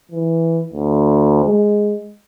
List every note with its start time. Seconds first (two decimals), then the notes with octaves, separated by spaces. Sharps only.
0.12 E3
0.74 D2
1.45 G#3